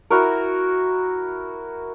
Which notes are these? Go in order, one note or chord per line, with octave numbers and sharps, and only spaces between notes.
E4 F#4 A#4